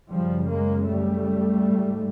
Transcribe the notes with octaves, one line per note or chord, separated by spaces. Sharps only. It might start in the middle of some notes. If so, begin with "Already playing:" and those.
F#2 C#3 F3 G3
G#3 A#3
G3 A3
G#2